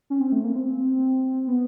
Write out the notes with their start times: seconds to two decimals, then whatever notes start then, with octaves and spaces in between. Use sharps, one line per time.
0.10 C#4
0.21 C4
0.32 A3
0.44 A#3
0.56 C4
1.47 B3